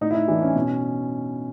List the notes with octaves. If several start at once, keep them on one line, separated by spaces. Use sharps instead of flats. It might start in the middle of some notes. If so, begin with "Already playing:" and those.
A2 D#4
E4
D#4
E3 D4
C#4
B2